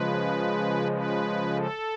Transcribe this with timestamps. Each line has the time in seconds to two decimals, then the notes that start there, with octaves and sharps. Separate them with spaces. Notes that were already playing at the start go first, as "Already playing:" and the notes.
Already playing: C#3 F3 G#3 B4
0.92 B4
1.55 A4